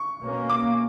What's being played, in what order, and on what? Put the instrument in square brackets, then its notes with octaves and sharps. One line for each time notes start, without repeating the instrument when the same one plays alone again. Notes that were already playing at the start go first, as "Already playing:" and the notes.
Already playing: [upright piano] C#6
[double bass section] B2 A#3 C#4
[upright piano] D6